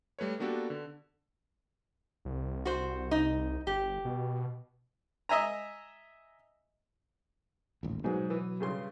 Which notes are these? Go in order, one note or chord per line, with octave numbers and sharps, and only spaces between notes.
G3 A3 B4 C#5
A#3 B3 D4 F#4 G4 A4
D3
C2
F#4 C5
D#4
G1 G4
B2
D#5 E5 G#5 A#5
D#1 A1
G#2 B2 F#3 B3 G#4
E3
G2 C#3 C6